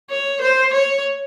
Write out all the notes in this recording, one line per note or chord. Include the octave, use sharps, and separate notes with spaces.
C#5
C5
C#5